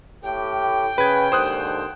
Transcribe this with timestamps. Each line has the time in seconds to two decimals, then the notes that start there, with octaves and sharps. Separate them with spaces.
0.24 A2 G4 G5
0.98 C#3 B4 G#6
1.32 D#2 G#2 D3 C5 D#6 F#6